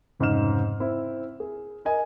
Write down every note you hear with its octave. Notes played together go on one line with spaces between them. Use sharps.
F1 G#2 C#3 D#5 F6 E7
C4 E4
G#4
A#4 D#5 G#5